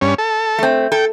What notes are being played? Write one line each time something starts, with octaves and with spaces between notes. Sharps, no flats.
G2 C#4
A4
A3 C4
A4 G5